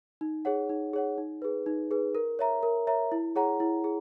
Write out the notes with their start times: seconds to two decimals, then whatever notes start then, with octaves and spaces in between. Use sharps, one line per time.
0.21 D#4
0.45 G#4 C#5 F#5
0.69 D#4
0.93 G#4 C#5 F#5
1.18 D#4
1.42 G#4 B4
1.66 D#4
1.91 G#4 B4
2.15 A#4
2.39 C#5 E5 A#5
2.63 A#4
2.87 C#5 E5 A#5
3.12 E4
3.36 G#4 C#5 F#5 A#5
3.60 E4
3.84 G#4